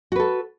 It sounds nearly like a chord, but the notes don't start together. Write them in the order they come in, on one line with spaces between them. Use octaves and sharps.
F#4 B4 A4